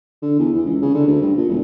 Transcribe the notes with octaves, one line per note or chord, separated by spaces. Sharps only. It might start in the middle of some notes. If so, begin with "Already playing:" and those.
D3
E2
E3
C#2
C#3
D3
D2
G2
A#2
E1